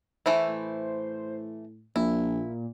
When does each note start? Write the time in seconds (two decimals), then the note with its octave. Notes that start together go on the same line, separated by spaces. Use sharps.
0.26 E3 A3 E4 C5
0.49 A2
1.96 A#1 A#2 E4